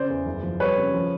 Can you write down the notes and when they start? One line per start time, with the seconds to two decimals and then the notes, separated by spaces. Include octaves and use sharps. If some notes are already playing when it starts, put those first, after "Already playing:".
Already playing: C#3 C5 D5
0.09 E2
0.26 F#1
0.43 F3
0.60 G3 B4 C#5
0.77 C#3
0.94 F3